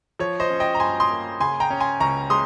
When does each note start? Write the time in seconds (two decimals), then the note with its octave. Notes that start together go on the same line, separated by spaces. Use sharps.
0.19 F3 C#5
0.40 C5 D#5
0.50 C#4
0.60 D#5 G5
0.75 A#5
0.80 G2 G#5 C6
1.00 C6 D#6
1.10 A#3
1.40 C#3 G#5 C6
1.60 G5 A#5
1.70 C#4
1.80 G#5 C6
2.00 C#2 A#5 C#6
2.30 G#3 C6 D#6